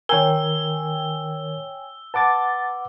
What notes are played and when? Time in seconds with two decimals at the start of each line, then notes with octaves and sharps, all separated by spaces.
0.09 D#3 A#4 C#5 G5 G#5 E6 G7
2.14 B4 F#5 A5 D6 A6